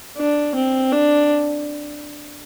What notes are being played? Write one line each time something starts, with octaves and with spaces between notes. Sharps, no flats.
D4
C4
D4